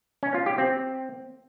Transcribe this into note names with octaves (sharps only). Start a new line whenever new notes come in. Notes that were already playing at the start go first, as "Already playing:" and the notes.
C#4
F4
G4
C4